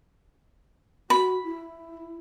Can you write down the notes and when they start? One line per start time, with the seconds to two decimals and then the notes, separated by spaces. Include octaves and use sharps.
1.10 F#4 B5
1.44 E4